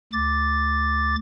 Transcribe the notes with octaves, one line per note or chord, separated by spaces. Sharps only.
D2 D6 A6